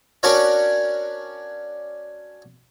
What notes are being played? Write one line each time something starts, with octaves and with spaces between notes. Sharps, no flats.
C#4 D4 F#4 A#4 C#5 D5